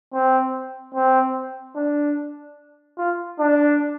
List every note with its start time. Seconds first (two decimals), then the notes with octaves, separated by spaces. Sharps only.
0.13 C4
0.95 C4
1.76 D4
2.98 F4
3.39 D4